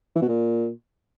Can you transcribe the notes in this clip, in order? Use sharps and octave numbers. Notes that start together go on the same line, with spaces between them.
E3
B2
A#2